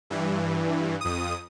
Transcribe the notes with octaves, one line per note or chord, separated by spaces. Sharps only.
G2 E3
F2 D#6